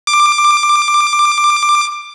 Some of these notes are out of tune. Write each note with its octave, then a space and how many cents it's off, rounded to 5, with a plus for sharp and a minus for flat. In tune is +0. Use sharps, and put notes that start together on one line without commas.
D6 +15